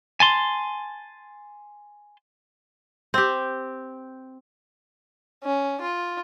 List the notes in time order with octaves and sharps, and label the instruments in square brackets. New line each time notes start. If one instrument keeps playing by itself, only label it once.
[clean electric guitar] G#5 A5 C6
[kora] C4 G4
[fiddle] C#4
F4